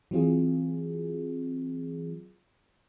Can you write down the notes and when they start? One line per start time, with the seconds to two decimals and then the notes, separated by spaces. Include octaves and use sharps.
0.11 E3 F#3 C4 F4 G#4